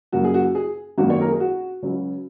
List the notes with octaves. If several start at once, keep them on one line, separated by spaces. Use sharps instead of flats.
F#2 C#3 A#3 F#4
G#4
F#4
G#4
G#1 F#2 D#3 A#3 C#4 F#4
C#5
A#4
G#4
F#4
C#2 C#3 F#3 C#4